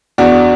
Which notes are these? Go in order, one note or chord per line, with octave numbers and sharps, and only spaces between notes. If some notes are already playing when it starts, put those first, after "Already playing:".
E2 D4 F#4